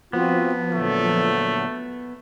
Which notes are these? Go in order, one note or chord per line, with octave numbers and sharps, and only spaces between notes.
F3 B3 C4 F4 F#4
A#2 D3 F#3 A3